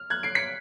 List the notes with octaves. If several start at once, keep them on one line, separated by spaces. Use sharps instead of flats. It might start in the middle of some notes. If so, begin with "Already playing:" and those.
Already playing: F6
F#6 G#6
C7 D7
B6 C#7